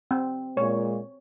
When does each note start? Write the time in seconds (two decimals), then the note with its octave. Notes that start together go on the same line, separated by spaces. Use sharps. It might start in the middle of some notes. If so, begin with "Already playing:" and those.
0.11 C4
0.57 A#2 G#3 C#5